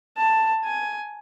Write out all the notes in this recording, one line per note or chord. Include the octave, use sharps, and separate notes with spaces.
A5
G#5